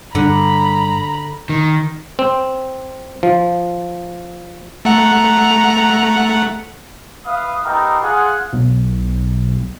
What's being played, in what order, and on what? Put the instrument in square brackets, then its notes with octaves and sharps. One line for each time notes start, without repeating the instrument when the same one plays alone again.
[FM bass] G2 [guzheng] D3 [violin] A#5 B5
[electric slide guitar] D#3
[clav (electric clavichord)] C4
F3
[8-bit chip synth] A3 F#5 [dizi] A#5
[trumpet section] B4 E5 F5 D#6
A3 B3 D#4 G4 A#4 F5
F4 G#4 F#5
[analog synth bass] B1